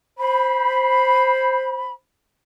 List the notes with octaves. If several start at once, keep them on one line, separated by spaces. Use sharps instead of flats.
C5 B5